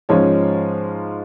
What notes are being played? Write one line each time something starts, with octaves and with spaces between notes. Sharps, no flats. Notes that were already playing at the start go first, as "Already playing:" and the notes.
G#2 F3 G#3 C#4 C#5